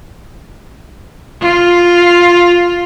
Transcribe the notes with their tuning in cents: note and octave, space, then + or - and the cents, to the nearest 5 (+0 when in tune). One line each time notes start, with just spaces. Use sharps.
F4 +5